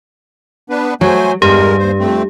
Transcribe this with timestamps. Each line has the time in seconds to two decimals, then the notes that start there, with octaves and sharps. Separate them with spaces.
0.70 B3 D4 B4
1.01 F#3 A3 C5 G#5
1.42 E2 G2 G#3 G4 A#4
1.79 D#2 C5
1.99 F2 A3 C4